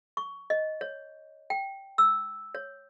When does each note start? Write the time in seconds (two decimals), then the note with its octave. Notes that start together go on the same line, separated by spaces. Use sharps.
0.17 C#6
0.50 D#5
0.81 C#5
1.50 G5
1.98 E6
2.55 C#5